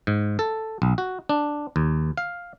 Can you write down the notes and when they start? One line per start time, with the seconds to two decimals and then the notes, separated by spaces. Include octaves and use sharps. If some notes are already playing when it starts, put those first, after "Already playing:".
0.07 G#2
0.39 A4
0.82 B1
0.98 F#4
1.29 D4
1.76 D#2
2.17 F5